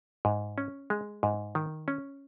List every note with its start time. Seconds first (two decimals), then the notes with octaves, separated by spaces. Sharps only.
0.25 G#2
0.58 C#4
0.90 G#3
1.23 G#2
1.55 D#3
1.88 C#4